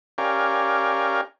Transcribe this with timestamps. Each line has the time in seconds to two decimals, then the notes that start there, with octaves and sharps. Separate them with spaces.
0.18 C#4 G4 A#4 D5 F5 G#5